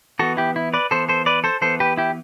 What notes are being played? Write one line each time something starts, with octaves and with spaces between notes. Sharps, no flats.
E3 B3 F#4 A4
E4 G4
E4
B4 D5
E3 B3 A4 C5
A4 C5
B4 D5
A4 C5
E3 B3 A4 C5
G4 B4
E4 G4